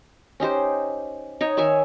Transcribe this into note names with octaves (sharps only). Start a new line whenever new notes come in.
C#4 D#4 G4 C5
D#4 C#5
D#3 C#5 E5 G#5